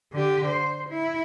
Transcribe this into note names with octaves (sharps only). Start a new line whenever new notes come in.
D3 G4
C5
E4